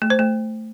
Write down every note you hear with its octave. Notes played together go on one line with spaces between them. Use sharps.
A3
C5
A3